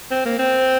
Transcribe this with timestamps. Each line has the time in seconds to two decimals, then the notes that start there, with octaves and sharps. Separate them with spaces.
0.11 C4
0.25 A#3
0.39 C4